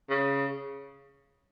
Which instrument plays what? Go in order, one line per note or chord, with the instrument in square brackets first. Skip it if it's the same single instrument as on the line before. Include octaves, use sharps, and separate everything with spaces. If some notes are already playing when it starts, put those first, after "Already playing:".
[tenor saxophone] C#3